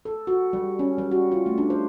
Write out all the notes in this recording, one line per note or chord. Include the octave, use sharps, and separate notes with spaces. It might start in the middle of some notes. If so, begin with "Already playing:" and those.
A4
F#4
G3
C#4
G3
F#4
F4
A3
D4
C5